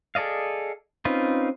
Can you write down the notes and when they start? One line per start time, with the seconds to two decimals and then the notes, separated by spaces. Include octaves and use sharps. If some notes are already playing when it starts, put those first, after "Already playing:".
0.15 G#4 A4 D5 D#5 F5
1.05 C4 C#4 D#4 F4 B4